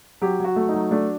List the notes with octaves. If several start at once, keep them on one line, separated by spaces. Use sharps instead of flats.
F#3 G4
F#3 F#4
A3
D#4
F#3
A3 D4